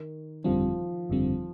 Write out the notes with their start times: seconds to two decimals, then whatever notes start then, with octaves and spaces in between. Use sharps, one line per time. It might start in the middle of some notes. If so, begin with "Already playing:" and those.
Already playing: D#3
0.44 G1 F2 D3 F3 G3 C4
1.10 G1 F2 D3 G3 C4